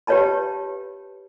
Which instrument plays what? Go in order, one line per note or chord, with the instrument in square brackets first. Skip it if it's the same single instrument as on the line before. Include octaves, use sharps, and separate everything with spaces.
[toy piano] G4 B4 C#5 F5 A5 B5